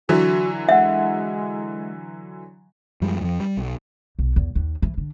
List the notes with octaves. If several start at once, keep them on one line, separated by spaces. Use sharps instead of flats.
D3 E3 F#3 F#4
G#3 E5 F#5
F#2 F3 G3 G#3
F2 F3
G3
B1
B1
E2
D#2
E3
D3